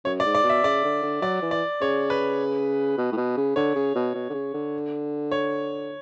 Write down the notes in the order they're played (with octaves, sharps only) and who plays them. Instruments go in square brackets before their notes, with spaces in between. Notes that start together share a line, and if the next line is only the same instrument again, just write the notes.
[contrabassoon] F#2 [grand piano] C#5
[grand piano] D5
[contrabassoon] G#2
[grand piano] D5
[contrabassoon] B2
[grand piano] E5
[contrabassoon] C#3 [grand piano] D5
[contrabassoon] D3
D3
[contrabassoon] F#3 [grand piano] D5
[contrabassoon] E3
[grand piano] D5
[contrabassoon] C#3 [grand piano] C#5
[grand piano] B4
[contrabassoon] B2
A2
B2
C#3
[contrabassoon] D3 [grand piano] C#5
[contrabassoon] C#3
B2
B2
D3
C#3
D3
[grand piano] C#5